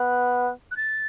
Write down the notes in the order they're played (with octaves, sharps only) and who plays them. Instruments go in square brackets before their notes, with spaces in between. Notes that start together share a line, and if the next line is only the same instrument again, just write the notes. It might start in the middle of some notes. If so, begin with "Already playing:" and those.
Already playing: [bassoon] B3 [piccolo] F#6
[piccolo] F#6
A6